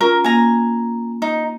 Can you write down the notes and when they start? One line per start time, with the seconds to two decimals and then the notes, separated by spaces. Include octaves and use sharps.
0.01 C#4 F4 A#4
0.24 A#3 G#5 A#5
1.22 D#4